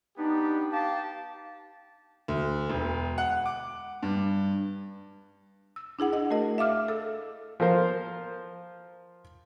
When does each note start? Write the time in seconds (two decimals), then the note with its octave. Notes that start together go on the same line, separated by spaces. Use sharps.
0.17 B3 D4 D#4 G4
0.72 G4 F5 A5
2.28 D2
2.70 E1
3.18 F#5
3.46 D6
4.03 G2
5.76 E6
5.99 D4 E4 G#4 F#5
6.13 D#5 F#5
6.31 A3 F#4 A#4 D#5
6.58 E5 F5 D6 F6
6.88 A4 E6
7.60 F3 F4 A#4 C5